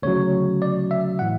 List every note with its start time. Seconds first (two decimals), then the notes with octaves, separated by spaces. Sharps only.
0.02 D2 C#3 F#3 C#5
0.62 D5
0.91 E5
1.19 A2 E3 F#5